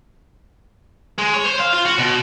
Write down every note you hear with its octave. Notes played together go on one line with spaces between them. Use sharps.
G#3
C#5
C5
F5
F4
F#4
B2